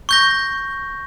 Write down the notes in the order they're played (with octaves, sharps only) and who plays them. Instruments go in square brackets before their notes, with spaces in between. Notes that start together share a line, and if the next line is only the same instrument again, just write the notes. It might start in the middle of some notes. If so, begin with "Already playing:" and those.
[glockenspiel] C#6 G6 A#6